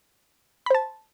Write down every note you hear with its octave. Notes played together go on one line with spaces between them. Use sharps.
C5 A5 B5